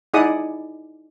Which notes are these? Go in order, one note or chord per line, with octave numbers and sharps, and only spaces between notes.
D#4 E4 G#4 D5 F#5 D#6